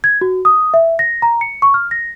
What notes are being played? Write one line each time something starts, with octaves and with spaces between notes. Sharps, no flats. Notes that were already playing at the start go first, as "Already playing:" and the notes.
G#6
F#4
D#6
E5
A#6
A#5
C#7
C#6
F6
A#6